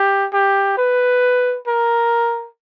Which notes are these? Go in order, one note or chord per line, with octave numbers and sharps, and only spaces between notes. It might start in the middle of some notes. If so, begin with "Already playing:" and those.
Already playing: G4
G4
B4
A#4